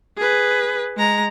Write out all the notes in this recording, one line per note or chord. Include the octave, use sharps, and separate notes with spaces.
G#4 B4
G#3 A#5